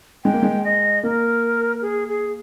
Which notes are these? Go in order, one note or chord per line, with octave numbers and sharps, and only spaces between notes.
G#3 G5
A#3
G#3
D#5
A#3 A#4
G#4
G#4